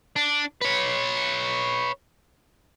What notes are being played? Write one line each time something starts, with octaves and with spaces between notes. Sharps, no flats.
D4
B4 C#5